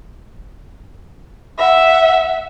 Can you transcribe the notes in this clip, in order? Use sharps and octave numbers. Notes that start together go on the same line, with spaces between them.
E5 F#5